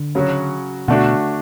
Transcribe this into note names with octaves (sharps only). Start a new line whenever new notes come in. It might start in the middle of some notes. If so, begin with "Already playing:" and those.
Already playing: D3
C#3 F#3 C#4 F#4
B2 D3 A3 D4 F#4